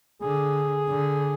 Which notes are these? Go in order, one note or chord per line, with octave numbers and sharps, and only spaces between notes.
D3 G#4
D3